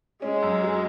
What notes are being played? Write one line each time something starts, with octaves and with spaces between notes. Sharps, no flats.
G#3 C#4
F#2
F#3